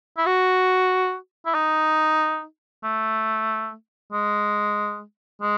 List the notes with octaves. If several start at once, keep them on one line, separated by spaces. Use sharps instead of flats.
E4
F#4
E4
D#4
A3
G#3
G#3